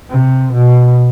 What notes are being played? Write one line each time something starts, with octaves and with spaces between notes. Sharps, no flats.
C3
B2